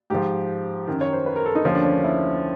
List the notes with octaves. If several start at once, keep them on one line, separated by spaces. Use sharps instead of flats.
G#2 F3 G4
F#2 D#3
C#5
C5
B4
A#4
A4
D#4
D#2 D3 F3 C#4
D4
C#4
D4
E4